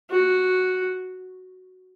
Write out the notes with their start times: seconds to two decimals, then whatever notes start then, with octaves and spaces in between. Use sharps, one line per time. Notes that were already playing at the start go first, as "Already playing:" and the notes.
0.11 F#4